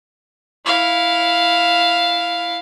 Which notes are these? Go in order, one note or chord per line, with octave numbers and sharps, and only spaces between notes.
E4 F5